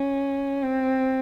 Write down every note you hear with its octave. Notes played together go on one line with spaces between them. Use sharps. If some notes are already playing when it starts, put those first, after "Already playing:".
Already playing: C#4
C4